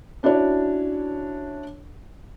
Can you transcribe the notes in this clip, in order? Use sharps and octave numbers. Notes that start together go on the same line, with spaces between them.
C#4 D4 E4 F#4 C#5 D5